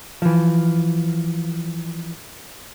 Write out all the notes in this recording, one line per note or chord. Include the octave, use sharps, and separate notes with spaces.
E3 F3